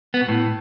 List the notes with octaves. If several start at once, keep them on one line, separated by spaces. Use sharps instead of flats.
B3
B2
A2